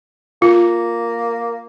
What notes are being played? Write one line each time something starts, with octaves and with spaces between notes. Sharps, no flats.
A#3 F4